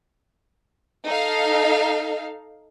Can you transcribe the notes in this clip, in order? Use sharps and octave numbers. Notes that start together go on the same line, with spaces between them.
D#4 A4 F5